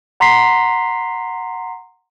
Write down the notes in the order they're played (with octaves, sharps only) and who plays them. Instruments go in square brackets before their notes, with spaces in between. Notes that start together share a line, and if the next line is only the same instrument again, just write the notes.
[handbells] F#5 A#5 C6 B6 C7